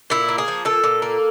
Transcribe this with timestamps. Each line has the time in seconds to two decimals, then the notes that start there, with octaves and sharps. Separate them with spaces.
0.10 A#2 E4
0.29 A#3
0.38 G#4
0.48 F3
0.65 A#2 A4
0.84 A#2
1.02 A#3